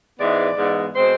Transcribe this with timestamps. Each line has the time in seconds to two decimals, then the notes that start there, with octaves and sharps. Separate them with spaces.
0.19 G#2 E3 G#3 B3 D5
0.57 G#2 E3 G#3 B3
0.96 B2 G#3 C4 C5